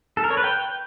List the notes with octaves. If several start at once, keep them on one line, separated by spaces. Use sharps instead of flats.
A4
A#4
C#5
B4
G5